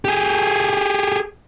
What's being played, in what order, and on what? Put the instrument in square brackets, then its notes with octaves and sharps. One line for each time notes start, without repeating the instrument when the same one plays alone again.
[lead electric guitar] G4 G#4